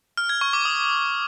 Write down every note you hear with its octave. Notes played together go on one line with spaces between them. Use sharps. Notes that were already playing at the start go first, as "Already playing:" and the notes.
F6
G#6
C#6
D6
D#6